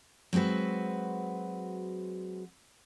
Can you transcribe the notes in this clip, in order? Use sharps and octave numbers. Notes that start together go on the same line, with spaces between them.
F#3 G#3 C4 F#4 B4